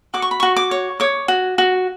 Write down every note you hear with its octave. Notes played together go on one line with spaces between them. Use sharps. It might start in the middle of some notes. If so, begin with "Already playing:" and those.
F#4 D6
C#6
B5
F#4 C#6
D6
C#5
C#5 D6
F#4
F#4